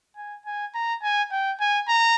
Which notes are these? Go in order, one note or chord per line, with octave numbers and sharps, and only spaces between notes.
G#5
G#5
A#5
G#5
G5
G#5
A#5